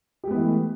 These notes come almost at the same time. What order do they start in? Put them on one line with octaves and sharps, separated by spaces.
G4 G#3 B3 E3 A3